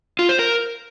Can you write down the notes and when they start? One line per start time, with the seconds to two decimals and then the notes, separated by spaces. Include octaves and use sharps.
0.19 F4
0.29 C5
0.39 A#4